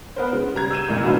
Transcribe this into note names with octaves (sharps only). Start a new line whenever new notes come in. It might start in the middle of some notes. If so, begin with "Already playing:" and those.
B3 A#4 C5
C#3
G3 A#5 G#6
E6 G6 D#7 E7
C2 F2 A#2
D#3 F#3 A3 B3 D4 F4